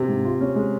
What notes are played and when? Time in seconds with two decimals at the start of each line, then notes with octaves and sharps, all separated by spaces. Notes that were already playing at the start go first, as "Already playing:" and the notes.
Already playing: C3
0.08 G#2
0.25 F4
0.41 C#4
0.55 G#3